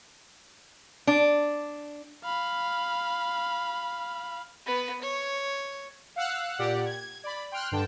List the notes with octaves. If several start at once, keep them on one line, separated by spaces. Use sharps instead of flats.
D4
F5 B5
B3 B4
C#5
F5 F#5 E6 F#6
A#2 G4 D5 F#5
G#6
D5 B5
G5 C6 F6 F#6
G2 D3 G5 A5